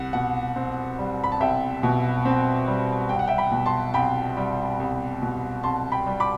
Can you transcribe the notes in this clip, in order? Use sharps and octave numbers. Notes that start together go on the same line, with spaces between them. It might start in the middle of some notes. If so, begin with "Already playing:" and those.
Already playing: C2 F#5
B2 F#5
C4
G3
B5
A5
C2 E5 G5
B2
C4
G3
C2 G5
F#5
E5 G5
G5 B5
B2
A5 C6
C2 G5 B5
G3
C2
B2
C2 A5 C6
G5 B5
G3
B5 D6